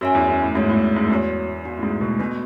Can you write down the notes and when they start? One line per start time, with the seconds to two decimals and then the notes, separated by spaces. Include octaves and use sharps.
0.01 F#2 F#4 C#5 E5 G#5
0.15 E2
0.28 F#2
0.42 A2
0.55 G#2 B3 F#4 C#5
0.69 A2
0.97 G#2
1.04 F#2
1.10 E2 B3 F#4 C#5
1.65 B3 D4 F#4
1.77 A2
1.83 G#2
2.01 B2
2.19 B2 A3 D4 F#4 B4